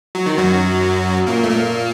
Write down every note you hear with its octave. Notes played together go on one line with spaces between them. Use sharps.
F#3
D#3
F#2 F#3
A#2 A#3
A3
A#2 A#3